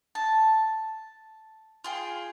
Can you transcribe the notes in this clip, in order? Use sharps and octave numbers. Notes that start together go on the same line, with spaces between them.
A5
F4 G#4 G5